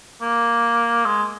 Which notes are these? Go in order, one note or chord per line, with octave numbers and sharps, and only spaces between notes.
A#3
G#3